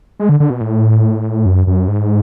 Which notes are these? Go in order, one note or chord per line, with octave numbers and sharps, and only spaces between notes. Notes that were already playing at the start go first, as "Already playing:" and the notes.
G#3
D3
D3
B2
A2
F#2
F#2
G#2